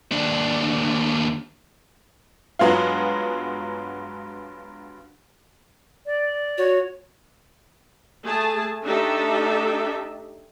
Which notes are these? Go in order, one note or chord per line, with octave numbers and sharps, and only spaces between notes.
D#2 D4
G2 F#3 G#3 B3 F4
D5
F#4 C#5
A3 G#4 A5
A3 D4 D#4 G4 A4 E5